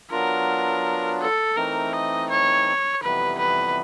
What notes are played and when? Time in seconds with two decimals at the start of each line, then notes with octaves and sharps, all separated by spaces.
0.11 F#3 B3 D4 F4 A#4
1.21 A4
1.56 E3 A3 C4 D#4 A#4
1.93 D#5
2.29 C#5
3.03 F2 C3 E3 G3 B3 B4
3.38 B4